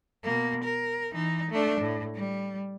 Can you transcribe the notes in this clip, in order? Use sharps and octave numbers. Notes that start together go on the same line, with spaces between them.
B2 A#3
A#4
E3 D#4
A3 D4
A2
G3